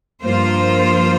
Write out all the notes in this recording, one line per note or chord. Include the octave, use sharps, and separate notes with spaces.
G2 F3 A#3 F4 C5